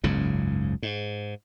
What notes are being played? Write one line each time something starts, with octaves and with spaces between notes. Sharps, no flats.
F#1 C#2 G#2 C#3
G#2